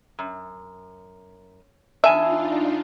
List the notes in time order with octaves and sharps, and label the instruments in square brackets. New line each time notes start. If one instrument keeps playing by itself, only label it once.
[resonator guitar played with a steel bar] F#2
[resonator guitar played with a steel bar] E2 G#5 A5 [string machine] D4 D#4 F4 [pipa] E5